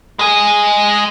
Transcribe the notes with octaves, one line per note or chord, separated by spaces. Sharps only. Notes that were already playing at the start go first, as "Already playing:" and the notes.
G#3 G#4